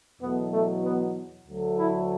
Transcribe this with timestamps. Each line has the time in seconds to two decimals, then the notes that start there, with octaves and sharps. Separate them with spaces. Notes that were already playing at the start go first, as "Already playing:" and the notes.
0.21 E2 B2 F#3 A3 B3
0.52 A3
0.84 B3
1.47 D2 D3 F#3 A3
1.78 E4